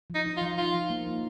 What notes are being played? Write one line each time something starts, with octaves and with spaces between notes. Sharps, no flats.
F3
D#4
D#4
F4
F3
F3 F4
F3
A#3
D#4